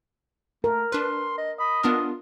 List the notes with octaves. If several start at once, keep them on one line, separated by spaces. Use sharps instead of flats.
A3 A#4
D4 B4 C6
D#5
D#5 B5
B3 D4 F4 A#4